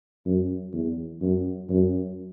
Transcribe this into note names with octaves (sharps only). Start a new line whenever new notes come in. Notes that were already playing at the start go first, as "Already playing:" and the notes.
F#2
E2
F#2
F#2